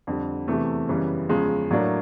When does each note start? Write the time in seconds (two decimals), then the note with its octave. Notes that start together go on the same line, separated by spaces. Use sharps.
0.07 F2 D3 G3
0.48 E2 C3 E3 A3
0.89 F#2 C#3 E3 G3 B3
1.29 E2 C#3 F3 G#3
1.71 A2 F#3 A#3 D4